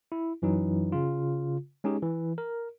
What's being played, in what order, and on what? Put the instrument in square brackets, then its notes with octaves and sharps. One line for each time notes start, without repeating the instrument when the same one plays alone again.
[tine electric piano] E4
F#2 E3 F#3 D#4
C#3 F4
G#3 C#4 D#4 G4 G#4
E3
A#4